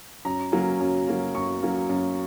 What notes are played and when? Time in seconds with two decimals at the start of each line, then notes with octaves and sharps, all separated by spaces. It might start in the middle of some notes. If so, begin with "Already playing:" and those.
0.25 F#2 A#5
0.52 F#3 A#3 C#4
0.81 F#2
1.07 F#3 A#3 C#4
1.35 F#2 C#6
1.62 F#3 A#3 C#4
1.89 F#2